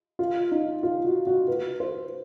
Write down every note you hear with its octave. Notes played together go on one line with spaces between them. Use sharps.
F4
D#4
F4
F#4
F#4
B4
C5